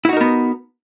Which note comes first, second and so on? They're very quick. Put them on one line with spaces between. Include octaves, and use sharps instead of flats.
E4 F#4 D#4 A#4 B3